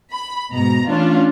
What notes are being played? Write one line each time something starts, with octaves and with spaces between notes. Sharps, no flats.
B5
G#2 B2 A#5
E3 A3 C#4 D4 F4